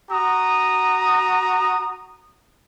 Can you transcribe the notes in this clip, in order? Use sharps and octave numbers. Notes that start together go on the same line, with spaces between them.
F#4 A#5 D#6